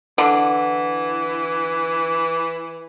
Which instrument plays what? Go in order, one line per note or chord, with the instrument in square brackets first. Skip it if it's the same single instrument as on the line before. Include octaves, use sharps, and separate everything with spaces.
[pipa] D3 [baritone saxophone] E3